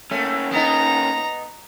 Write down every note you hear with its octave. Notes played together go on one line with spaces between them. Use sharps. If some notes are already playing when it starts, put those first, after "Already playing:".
A3 A#3 C#4
B3 D#4 A#5